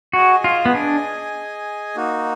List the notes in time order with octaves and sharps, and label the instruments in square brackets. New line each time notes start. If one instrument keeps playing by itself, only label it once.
[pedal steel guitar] F#4 [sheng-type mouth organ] G#4 D#5 G#5
[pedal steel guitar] F4
B3
D4
[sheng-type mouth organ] A#3 D#4 F#4